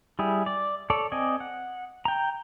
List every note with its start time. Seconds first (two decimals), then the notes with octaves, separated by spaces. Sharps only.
0.19 G3 E4 G#4
0.46 D5
0.90 A4 C#5 D5
1.12 C4 D5 D#5 G#5
1.40 F#5
2.05 G5 A#5